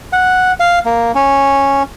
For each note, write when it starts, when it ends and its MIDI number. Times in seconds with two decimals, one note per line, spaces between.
0.13 0.52 78
0.60 0.79 77
0.85 1.12 58
1.15 1.83 61